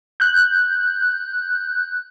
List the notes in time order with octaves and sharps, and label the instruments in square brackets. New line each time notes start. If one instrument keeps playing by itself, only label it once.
[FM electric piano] F#6 G6